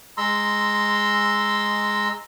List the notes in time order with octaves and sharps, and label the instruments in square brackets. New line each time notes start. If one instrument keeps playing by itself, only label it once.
[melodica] G#3 A#5 C6 E6